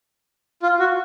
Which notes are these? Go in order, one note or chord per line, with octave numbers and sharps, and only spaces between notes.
F4
F#4